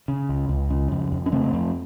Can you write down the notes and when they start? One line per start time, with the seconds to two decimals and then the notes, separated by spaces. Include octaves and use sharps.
0.08 C#3
0.29 C#2
0.49 C#2
0.70 C#3
0.92 F2
1.12 F2
1.26 C#4
1.32 C#3 A3 C4
1.53 F2